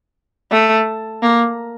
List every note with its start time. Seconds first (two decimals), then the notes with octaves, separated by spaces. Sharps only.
0.52 A3
1.23 A#3